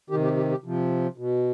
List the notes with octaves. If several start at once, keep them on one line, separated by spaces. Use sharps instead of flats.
C3 D#3 G4
G4
G4
G4
C3 F3
B2